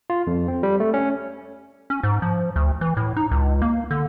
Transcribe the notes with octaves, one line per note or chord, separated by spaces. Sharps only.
F4
F2
C4
G3
A3
C#4
C#4
G#2
F3
D2
E3
A2
D#4
C#2
A#3
D3